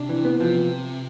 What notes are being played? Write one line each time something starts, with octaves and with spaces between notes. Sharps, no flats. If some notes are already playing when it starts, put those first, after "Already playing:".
Already playing: C3 D4
E3
B3
C3 F3